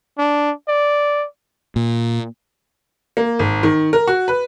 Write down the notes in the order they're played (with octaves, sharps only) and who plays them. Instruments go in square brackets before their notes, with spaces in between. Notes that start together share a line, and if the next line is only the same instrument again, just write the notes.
[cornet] D4
D5
[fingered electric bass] A#2
[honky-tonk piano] A#3
G#1
D#3
A#4
F#4
B4